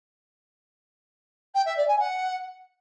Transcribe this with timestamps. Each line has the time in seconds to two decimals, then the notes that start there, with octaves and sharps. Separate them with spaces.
1.54 G5
1.65 E5
1.77 D5
1.88 G#5
1.99 F#5